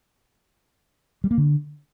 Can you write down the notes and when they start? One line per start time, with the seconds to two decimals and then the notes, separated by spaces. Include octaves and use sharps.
1.24 G3
1.31 A#3
1.38 D3